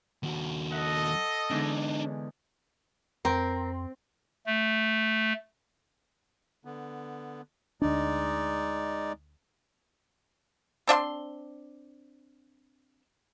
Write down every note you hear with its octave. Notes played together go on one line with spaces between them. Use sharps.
D#2 F#4
A4 D#5 F#5
E2 G#2 D3 D4 D#4
F2 C4 A#4
A3
D3 B3
D2 G#3 D4 D#4 D5
C4 D4 E5 C6